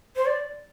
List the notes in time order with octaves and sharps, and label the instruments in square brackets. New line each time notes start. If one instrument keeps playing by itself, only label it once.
[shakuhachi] C5
D5